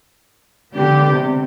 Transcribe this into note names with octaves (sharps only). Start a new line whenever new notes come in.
D3 G#3 B3 D4 G4
C3